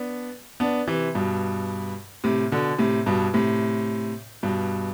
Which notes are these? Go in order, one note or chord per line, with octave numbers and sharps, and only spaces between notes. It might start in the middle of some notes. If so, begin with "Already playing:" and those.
Already playing: B3 D4
B3 D4
C3 E3
G2 B2
A2 C3
B2 D3
A2 C3
G2 B2
A2 C3
G2 B2